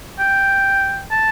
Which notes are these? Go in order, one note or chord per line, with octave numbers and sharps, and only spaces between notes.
G5
A5